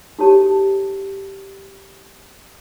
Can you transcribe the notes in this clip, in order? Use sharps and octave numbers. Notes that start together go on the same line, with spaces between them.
D#4 F#4 G4 A4 C#5 A5